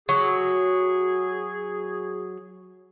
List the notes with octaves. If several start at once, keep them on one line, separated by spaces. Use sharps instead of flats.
F#3 G#4